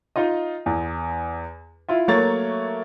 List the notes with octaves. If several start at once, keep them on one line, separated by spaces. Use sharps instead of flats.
D#4 F4 D#5
E2
E4 F4 E5
F#3 A3 A#3 C#5 A6